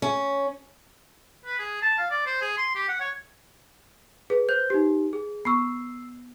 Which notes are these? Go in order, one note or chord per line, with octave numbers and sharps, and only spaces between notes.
C#4
B4
G#4
A5
F5
D5
C5
G#4
C6
G4
F#5
C#5
G#4 B4
C5 G6
D#4 G4
G#4
B3 C#6 E6 C7